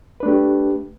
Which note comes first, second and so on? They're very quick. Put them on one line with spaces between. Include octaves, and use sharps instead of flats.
B4 D4 A3 G4